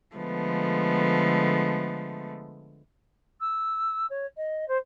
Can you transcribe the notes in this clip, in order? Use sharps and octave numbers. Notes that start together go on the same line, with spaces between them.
D3 F3 G#3 A3 B3
E6
C#5
D#5
C5